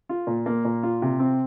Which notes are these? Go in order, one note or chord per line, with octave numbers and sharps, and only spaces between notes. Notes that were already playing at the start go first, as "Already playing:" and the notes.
F4
A#2
A#3
A#2
F4
C3
C4